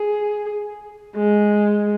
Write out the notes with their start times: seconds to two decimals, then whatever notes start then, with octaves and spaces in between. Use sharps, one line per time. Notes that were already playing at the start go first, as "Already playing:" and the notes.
Already playing: G#4
1.16 G#3